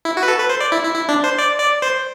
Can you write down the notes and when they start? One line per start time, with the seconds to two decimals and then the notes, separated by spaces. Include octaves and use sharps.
0.05 E4
0.17 F#4
0.23 B4
0.28 A4
0.39 B4
0.50 C5
0.60 D5
0.72 E4
0.83 E4
0.94 E4
1.09 D4
1.24 C5
1.39 D5
1.60 D5
1.82 C5